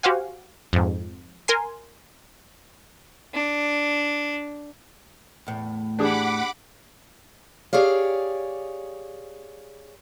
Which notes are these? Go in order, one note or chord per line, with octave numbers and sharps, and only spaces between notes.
F#4 G4 C5 F5 F#5 G#5
F2 G#2
A#4 G#5 C6
D4
E2 A2
D4 G4 G#4 F#5 B5 D6
G4 G#4 C#5 D5 F5